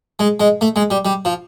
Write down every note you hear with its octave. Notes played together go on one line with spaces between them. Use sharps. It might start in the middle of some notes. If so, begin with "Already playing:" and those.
G#3
G#3
A3
G#3
G3
G3
F3